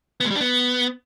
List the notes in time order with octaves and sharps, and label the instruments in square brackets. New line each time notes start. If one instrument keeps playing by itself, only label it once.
[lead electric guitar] B3
G#3
G3
D4
B3